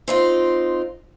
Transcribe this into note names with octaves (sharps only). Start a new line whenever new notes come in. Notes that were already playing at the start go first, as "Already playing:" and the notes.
C4 D#4 F4